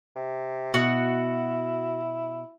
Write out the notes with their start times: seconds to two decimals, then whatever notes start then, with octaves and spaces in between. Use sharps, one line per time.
0.16 C3
0.74 B2 E4 F#4